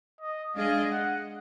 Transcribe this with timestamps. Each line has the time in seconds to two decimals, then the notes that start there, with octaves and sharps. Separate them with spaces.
0.21 D#5
0.56 G#3 D4 G#4 D#5 F5
0.90 F#5